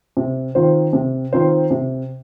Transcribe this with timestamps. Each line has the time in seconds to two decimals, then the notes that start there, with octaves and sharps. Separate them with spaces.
0.17 C3
0.55 D#3 C4 F4 C5
0.93 C3
1.33 D#3 C4 F4 C5
1.71 C3